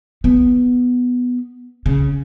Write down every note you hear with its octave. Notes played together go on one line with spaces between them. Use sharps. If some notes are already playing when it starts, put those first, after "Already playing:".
B3
C#3